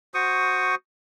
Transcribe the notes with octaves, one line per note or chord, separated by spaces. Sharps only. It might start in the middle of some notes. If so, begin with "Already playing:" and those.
F#4 C5 C#6 D#6